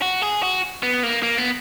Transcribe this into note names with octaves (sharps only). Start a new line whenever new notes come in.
F#4
G#4
F#4
B3
A#3
A#3
B3